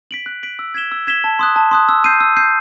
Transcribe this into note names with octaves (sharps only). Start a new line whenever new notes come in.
B6 D7 F#7
F#6
B6 D7 F#7
E6
G#6 B6 E7 G7
E6
G#6 B6 E7 G7
A5
C6 D#6 F#6
A5
C6 D#6 F#6
E6
G6 C7 D#7
E6
G6 C7 D#7